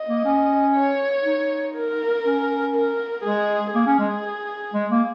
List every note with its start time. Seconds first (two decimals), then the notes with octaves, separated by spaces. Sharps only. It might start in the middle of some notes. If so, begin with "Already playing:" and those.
Already playing: D#5
0.09 A#3
0.25 C#4
0.75 C#5
1.24 D#4
1.75 A#4
2.25 C#4
2.75 A#4
3.24 G#3 G#4
3.74 A#3 G#4
3.87 C#4
3.99 G#3
4.74 G#3
4.91 A#3